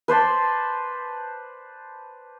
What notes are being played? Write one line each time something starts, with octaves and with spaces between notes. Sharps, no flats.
B4 C5 D5 A5